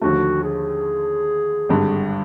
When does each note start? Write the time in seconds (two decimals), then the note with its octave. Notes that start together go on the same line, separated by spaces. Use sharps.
0.01 D#2 D3 F3 A3 F#4
0.43 G#4
1.69 G#1 G2 D3